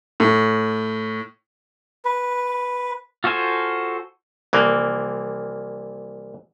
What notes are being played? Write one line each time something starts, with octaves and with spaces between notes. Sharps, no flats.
A2
B4
F4 F#4 A4 C5 G#5
C2 E3 F3 A#3